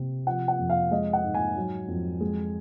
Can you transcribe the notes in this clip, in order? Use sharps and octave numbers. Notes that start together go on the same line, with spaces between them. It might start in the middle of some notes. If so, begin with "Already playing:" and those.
Already playing: C3 C4
F3 F#5
F#5
F2
F5
G#3 D#5
F#5
G#2
G#5
F#3
F2
G#3